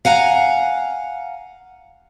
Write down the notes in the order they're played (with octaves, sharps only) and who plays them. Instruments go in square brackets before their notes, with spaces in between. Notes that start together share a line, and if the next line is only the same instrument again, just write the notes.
[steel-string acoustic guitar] F5 F#5 G#5 A#5